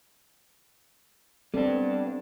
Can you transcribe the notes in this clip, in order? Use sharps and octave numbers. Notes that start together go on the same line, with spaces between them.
G3 B3 C4 D4 A4